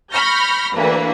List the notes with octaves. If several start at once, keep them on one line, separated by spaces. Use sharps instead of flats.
B5 C#6 F6 G6 A#6
D2 E3 A#3 B4